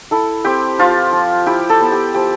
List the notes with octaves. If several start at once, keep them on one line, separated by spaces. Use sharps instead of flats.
E4 A4
C4 G4
F3 F4
F3
E4 G4
A4
B3
G4
F3 G4